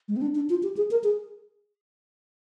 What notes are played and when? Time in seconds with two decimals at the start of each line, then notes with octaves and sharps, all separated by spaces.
0.08 G#3
0.16 C4
0.21 D4
0.35 D4
0.50 F4
0.63 G4
0.77 G#4
0.91 A#4
1.04 G#4